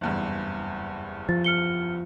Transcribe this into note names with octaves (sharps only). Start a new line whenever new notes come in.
F#1 E2 G2
F3 A6
F6 C#7 G7